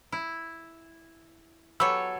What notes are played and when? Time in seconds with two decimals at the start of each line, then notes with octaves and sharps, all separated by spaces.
0.12 E4
1.80 F#3 B3 G4 A4 C#5 E6